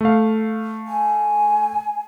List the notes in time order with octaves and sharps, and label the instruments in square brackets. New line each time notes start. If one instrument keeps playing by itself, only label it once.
[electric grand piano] A3 F5
[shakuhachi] G#5